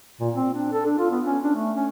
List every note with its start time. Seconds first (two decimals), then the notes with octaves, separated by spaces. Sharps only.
0.21 A#2
0.35 C4
0.54 D4
0.72 A4
0.86 D4
0.98 F4
1.11 B3
1.25 C#4
1.44 D4
1.55 A3
1.76 C#4